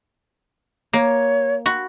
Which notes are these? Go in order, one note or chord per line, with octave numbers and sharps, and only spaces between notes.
A#3 C#5
F#4 B5